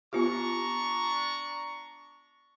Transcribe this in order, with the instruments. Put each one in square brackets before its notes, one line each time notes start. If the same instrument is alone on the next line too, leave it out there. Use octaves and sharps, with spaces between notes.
[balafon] B3 F4 G4 [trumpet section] D4 A#5 C#6